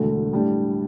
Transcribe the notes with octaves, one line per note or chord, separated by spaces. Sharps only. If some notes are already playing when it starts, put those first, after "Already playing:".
Already playing: E1 D2 D3 A3
A2 G3 D4